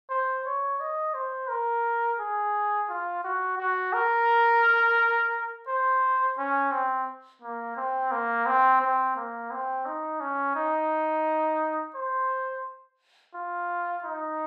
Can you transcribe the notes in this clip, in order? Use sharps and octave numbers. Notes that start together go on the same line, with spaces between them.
C5
C#5
D#5
C5
A#4
G#4
F4
F#4
F#4
A#4
C5
C#4
C4
A#3
C4
A#3
C4
C4
A#3
C4
D#4
C#4
D#4
C5
F4
D#4